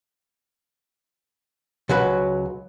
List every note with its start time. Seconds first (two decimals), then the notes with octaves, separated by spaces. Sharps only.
1.89 C#2 F#3 F#4 B4